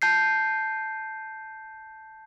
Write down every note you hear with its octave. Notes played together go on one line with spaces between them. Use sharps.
A5 G6 C7